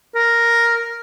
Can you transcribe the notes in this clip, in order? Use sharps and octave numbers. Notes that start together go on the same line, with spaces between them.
A#4